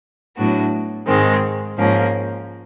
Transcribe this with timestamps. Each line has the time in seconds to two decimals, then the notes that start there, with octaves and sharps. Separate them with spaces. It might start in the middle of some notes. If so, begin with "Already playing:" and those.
0.36 A2 F#3 B3 D4 F#4
1.07 G#2 D#3 G#3 C4
1.77 G#2 F3 A#3 C#4